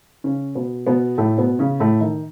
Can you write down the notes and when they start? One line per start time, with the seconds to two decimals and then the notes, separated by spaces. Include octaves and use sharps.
0.24 C#3 C#4
0.55 B2 B3
0.87 B2 B3
1.18 A2 A3
1.38 B2 B3
1.59 C#3 C#4
1.80 A2 A3
2.01 D#3